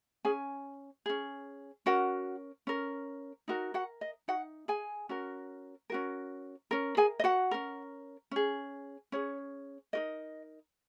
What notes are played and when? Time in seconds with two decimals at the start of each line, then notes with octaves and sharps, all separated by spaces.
0.25 C#4 G#4 G#5
1.06 C#4 G#4
1.86 C#4 F#4 A#4 F#5
2.67 C#4 A#4
3.48 D#4 F#4 A#4
3.74 F#4 F#5
4.01 D#5
4.28 D#4 F#4 F#5
4.68 G#4 G#5
5.09 C#4 F#4 A#4
5.90 C#4 F#4 A#4
6.71 C#4 A#4
6.97 G#4 G#5
7.19 D#5
7.24 F#4 F#5
7.51 C#4 A#4
8.31 C#4 G#4
9.12 C#4 G#4 C#5
9.93 D#4 F#4 A#4 D#5